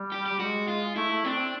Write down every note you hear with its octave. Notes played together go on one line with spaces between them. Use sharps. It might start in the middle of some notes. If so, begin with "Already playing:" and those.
Already playing: G3
G4
G4
G3
G#3 F#4
F4
A3 E4
A3
C4 D4
C4